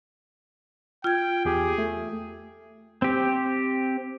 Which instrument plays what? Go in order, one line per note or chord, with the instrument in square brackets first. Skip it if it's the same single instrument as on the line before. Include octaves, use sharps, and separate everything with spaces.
[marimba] F4 G#6 [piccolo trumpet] G5
[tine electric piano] E2 G4 [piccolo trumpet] G#4
[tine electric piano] A3
[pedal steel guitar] C4 G4